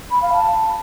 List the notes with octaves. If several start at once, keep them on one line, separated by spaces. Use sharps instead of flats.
B5
F5
A5